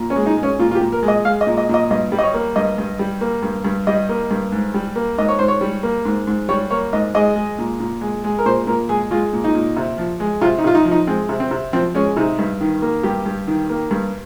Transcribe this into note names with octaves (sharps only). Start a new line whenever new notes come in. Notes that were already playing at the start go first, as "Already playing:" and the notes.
Already playing: A#2
C#4
G#3
D#4
G#3
C#4
A#2 F4
F4
G4
A#2
A#4
G#3
D#5
G#3 F5
D#5
A#2
D#5
A#2 D#5
G2 D#5
G3
D#5
C#5
A#3
G2 D#5
G2
G3
A#3
G2
G2
G3 D#5
A#3
G2
G#2
G3
A#3
G#2 D#5
C#5
G#2 C5
C#5
G3
A#3
G#2
G#2
G3 C#5
A#3 C#5
G#2 D#5
G#3 D#5
G#3
A#2
A#2
G#3
G#3
A#4
A#2 C5
A#2 A#4
G#3 G#4
G#3 F4
A#2
D#4
A#2
C3
F3
G#3
C3 F4
D#4
C3 F4
D#4
F3
D#4
G#3 C4
C3
C4
C3
F3 C4
G#3 C#4
C3 D#4
G2
D#3
A#3
G2 G4
G2
D#3
A#3
G2